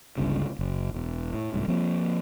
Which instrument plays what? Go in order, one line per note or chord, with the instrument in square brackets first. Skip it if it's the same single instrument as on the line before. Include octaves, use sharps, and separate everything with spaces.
[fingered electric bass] G1 C#2 G2 C#3
F#1
E1
A2
C2 G#2
F3 A#3 C4